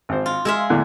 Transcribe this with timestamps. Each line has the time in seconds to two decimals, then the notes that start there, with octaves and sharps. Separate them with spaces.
0.09 G#1 C5
0.26 F4
0.45 G#3 G#4 E5 E6 F6
0.70 E2 A2 D3